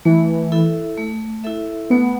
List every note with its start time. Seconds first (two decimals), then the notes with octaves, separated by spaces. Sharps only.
0.05 E3 A3
0.52 E4 A4 E5
0.97 A3
1.44 E4 A4 E5
1.90 A3 B3